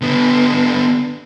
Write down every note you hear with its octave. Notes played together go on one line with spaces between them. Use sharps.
D3 B3